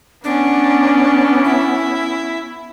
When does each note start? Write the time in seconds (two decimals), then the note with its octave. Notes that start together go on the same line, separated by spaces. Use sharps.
0.24 B3 C#4 D4
1.44 E4